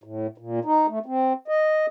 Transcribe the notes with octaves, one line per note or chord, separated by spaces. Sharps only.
A2
A#2
D#4
A3
C4
D#5